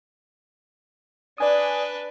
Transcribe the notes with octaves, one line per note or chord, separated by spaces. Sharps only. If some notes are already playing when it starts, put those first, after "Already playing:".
D4 B4 D5 G#5 D#6